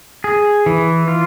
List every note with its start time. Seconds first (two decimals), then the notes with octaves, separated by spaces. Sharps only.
0.24 G#4
0.66 E3
1.08 F4